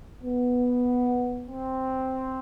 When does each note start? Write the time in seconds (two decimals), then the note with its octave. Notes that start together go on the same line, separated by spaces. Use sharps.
0.22 B3
1.48 C4